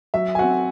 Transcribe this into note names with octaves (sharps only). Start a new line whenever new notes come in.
F#3 E5
G#5
C4 F#4 F#5